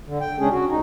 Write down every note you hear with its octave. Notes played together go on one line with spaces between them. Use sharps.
D3
G5
C#3 G#3 C#4 D4 G#4
F#4
D2 D#4